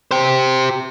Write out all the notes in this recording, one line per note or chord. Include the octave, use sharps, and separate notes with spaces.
G4 C5